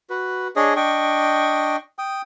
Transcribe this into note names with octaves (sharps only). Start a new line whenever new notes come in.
F#4 B4
D4 G#4 C#5 D#5
D4 D#5 G5 C#6
G5 D#6